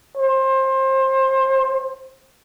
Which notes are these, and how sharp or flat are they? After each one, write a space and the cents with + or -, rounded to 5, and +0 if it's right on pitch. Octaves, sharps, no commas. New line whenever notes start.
C5 +25